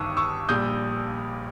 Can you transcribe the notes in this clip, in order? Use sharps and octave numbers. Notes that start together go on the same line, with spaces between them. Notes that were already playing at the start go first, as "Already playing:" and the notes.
Already playing: G1 G2 D#3 C#6 D#6 E6
C#6 E6
A#1 A#2 G3 D#6 G6